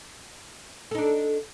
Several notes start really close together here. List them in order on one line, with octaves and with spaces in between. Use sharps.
A4 D#4 D4